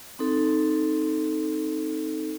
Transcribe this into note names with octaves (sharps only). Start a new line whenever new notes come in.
C4 D#4 A4